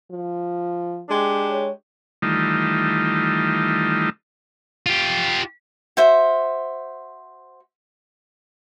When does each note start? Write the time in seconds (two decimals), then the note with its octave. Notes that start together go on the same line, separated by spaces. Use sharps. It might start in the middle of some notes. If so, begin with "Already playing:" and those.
0.11 F3
1.09 G#3 D4 G4
1.50 C#5
2.22 D#3 E3 G3 A3 D#4 F4
4.86 F4 G4
5.97 F#4 C5 E5